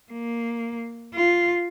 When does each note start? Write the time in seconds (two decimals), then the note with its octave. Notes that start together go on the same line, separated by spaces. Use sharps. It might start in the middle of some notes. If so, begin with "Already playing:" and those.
0.12 A#3
1.14 F4